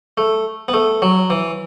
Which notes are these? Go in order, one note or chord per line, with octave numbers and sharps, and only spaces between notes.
A3
B3
A3
F#3
E3